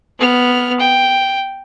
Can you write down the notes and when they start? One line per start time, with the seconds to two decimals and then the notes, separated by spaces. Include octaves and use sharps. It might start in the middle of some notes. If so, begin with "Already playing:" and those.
0.19 B3 F6
0.80 G5